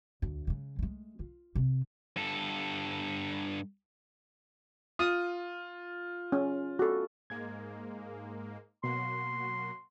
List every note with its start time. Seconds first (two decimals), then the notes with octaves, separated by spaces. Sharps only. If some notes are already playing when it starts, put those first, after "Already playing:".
0.22 D2
0.47 C#3 G#3
0.79 G#3 A3
1.19 F4
1.55 C3 C4
2.16 G2 A4
4.99 F4 D#6
6.32 C#4
6.79 F#4 A4
7.30 G#2 G#3 A#3 G#6
8.84 B2 F#3 A#3 F#4 C6